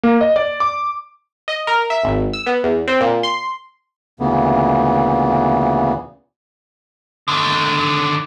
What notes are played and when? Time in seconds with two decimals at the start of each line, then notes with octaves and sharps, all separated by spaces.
0.03 A#3
0.21 D#5
0.36 D5
0.60 D6
1.48 D#5
1.67 A#4
1.90 E5
2.04 G#1
2.33 E6
2.46 B3
2.64 E2
2.88 C4
3.01 A#2
3.23 C6
4.20 D2 A#2 C#3 E3 B3
7.28 D3 D#3